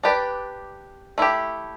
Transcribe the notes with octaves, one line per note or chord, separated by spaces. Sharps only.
D4 G4 B4 D5
A3 E4 G4